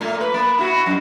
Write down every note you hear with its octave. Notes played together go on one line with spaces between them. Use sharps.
A#2 A3
B4
A#3
E4 F#4
F#2